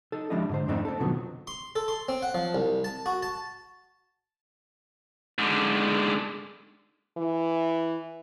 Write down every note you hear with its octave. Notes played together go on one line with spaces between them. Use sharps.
D#4 A4
F3 G3 G#3 D4 E4 D#5
G#2 D3 C5
F2 G#2 A3 C4 D4 D#4
C4 A4
B2 D3 D#3 F3 F#3 B3
C6
A4
C6
C4
F#5
F3
C2
A5
F#4
A5
G#2 D3
E3